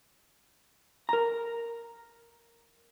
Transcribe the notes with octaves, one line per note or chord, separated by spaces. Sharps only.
A#4 A#5